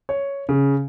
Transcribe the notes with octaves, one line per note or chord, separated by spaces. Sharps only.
C#5
C#3